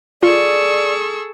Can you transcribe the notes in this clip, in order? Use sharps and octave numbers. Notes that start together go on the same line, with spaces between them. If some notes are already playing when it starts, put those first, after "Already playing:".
F4 G#4 A4 D5 C#6 E6